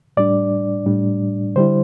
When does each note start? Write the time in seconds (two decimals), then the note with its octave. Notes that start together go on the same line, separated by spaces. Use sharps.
0.17 A2 G3 D4 D5
0.86 A2 G3 D4
1.56 D3 G3 E4 C5